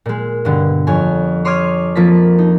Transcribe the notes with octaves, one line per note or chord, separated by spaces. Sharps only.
A#2 G#3
G2 B2 D3
F2 C#5 G#5
C#5 C6 D6 D#6 F6 G#6
F3 A#3 C4 A5 B6
D#4